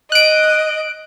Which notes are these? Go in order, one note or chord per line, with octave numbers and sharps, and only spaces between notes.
D#5 F#6 D7